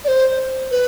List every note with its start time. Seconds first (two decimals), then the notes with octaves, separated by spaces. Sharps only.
0.04 D5
0.08 C5
0.71 B4